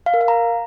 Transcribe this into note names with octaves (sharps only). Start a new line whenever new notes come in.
F5
A#4
F5
A#5